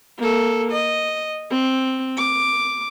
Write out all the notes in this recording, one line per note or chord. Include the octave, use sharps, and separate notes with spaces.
A#3 A4
D#5
C4
D6